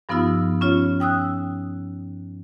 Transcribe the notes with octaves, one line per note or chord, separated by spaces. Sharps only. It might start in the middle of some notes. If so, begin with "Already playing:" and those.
G2 F3 B3 D#4 F4 E6
C#4 F4 C#5
G5 D#6 E6 F#6